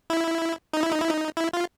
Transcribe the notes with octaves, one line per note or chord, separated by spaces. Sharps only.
E4
D#4
E4
D#4
E4
D#4
E4
F4